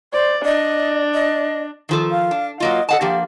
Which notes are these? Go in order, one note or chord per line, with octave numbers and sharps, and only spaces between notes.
C5 D5
D4 D#5
D#5
D#3 F3 A4
F5
D4
F#3 A#3 F4 D#5
A4 D#5 F#5 A5
F3 A#3 D4 G4